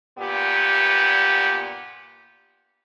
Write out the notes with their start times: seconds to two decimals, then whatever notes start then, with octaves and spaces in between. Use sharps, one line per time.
0.18 G2 A#2 B3 G4